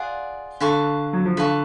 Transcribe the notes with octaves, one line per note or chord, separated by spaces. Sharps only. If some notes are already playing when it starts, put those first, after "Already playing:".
Already playing: F4 G#4 D5 F#5
D3 B4 F5 A5 C#6
F#3
F3
D3 B4 F5 A5 C#6